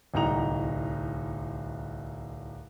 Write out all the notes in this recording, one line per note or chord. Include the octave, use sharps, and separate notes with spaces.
D1 C2 D#4 G5 A#5 F7